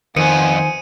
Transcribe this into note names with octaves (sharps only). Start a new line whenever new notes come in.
F2 D#3 B3 C5 G#5 D#6 C#7 D#7